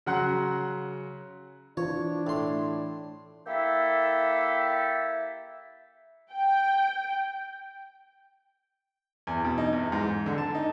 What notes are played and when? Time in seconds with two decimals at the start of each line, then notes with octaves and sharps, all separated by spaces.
0.06 C#3 F#3 F#5 A#5 C6 F#6
1.77 E3 D4 F4 C5 C#5
2.27 A2 C6
3.47 A#3 E4 G4 A4 E5
6.33 G5
9.27 E2
9.45 B2
9.58 D#4
9.73 E2
9.92 G#2
10.26 D3
10.38 A5
10.55 D#4